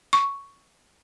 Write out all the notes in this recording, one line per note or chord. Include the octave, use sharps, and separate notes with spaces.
C#6